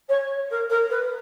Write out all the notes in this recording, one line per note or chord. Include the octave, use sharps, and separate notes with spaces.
C#5
A#4
A#4
B4